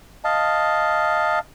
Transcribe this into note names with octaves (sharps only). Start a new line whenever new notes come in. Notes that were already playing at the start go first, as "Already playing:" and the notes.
D#5 F5 A5